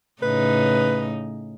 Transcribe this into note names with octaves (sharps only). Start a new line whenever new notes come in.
A2 C#3 D#4 B4